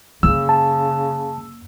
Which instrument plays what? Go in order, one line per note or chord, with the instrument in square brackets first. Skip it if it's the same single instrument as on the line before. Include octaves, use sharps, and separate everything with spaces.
[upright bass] F#2 A#3 [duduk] C#3 [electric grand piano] E6
[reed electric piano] A5